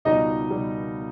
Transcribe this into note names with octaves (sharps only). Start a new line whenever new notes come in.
C#2 B2 G3 D#4 D#5
B2 G3